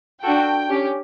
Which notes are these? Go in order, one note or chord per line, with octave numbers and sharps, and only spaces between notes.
D4 F#4 A4 G5
C#4 G4